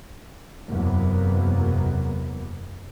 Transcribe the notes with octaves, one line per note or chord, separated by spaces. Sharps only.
F#1 E2 C3 F#3 A#3 B3